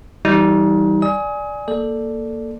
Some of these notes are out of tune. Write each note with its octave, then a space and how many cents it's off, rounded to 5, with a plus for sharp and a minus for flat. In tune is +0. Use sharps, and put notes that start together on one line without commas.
E3 +0 G3 -10 D#4 +30
D5 +5 G#5 +0 D#6 +35
A#3 +0 A4 +0 D5 +5